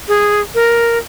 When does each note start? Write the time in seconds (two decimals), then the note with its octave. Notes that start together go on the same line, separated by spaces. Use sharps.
0.08 G#4
0.55 A#4